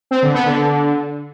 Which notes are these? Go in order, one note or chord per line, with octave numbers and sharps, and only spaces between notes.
C4
D3
B3
D3